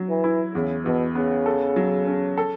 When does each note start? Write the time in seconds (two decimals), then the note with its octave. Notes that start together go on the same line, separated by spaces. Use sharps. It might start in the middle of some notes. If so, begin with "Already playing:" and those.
Already playing: F#3
0.09 E3
0.24 E4
0.55 E2 C#3
0.85 E2 B2
1.15 C#3 B3
1.46 A4
1.76 F#3
2.07 C#4
2.37 A4